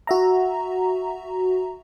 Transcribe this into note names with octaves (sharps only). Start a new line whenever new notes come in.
F#4 E5 A#5